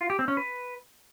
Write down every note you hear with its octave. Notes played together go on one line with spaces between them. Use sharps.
F4
G4
C4
C#4
B4